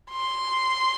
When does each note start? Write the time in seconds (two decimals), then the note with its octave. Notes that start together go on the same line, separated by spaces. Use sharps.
0.11 C6